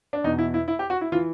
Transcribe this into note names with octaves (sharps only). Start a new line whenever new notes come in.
D4
E2 B2 D#4
E4
E4
E4
G4
F#4
E4
E3 F4